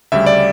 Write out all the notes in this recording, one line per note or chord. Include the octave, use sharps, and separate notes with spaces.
D2 C#3 G3 E5
D5